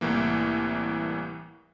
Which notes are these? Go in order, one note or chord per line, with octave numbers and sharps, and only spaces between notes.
C2 A2 E3 A#3